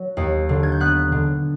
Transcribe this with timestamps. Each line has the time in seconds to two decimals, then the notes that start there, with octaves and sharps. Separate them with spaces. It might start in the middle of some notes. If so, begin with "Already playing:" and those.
Already playing: F#3
0.17 D#2
0.49 D3
0.63 G#6
0.72 G6
0.80 B3 F#6
1.12 D3